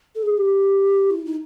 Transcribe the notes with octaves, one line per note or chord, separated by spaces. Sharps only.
A4
G#4
G4
E4
D#4